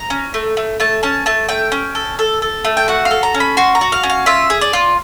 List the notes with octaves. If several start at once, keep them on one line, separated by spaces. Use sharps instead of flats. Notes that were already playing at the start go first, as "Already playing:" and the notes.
Already playing: A#5
C#4
A3
A3
A3 A5
C#4 A5
A3 A5
A3 G5
C#4
A4
A4
A4
A3
G5
F#4 F#5
F5
A4
A#5
C#4
B5
F#4 C6
A#5
F#4
F5
C#4
F5
F4 E5
G#4
D5
F4